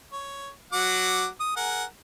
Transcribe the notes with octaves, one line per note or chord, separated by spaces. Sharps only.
C#5
F#3 F#5 D6
D#6
G#4 A#4 F#5